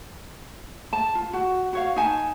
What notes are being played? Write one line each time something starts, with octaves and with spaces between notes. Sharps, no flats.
A5
F4
F#4
F#4 C#5 F5
D#4 G#5 A5